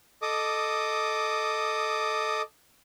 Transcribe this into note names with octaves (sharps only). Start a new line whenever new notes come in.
A4 D#5 D6 D#6